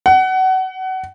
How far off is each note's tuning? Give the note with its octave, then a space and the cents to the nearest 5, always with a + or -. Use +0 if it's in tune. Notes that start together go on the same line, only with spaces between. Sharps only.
F#5 +25